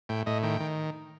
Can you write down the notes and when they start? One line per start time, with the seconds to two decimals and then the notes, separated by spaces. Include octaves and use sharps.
0.09 A2 G5
0.26 A2 D#5
0.43 D#3 G5
0.60 D#3